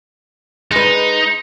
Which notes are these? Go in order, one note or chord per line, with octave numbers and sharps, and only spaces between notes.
G#3 D#4 B4